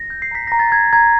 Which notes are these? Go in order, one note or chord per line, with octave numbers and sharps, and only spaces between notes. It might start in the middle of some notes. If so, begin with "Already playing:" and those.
Already playing: A#6
G6
C7
A#5 B6
A#5 A#6
A6
A#5 G#6
A#5 G#6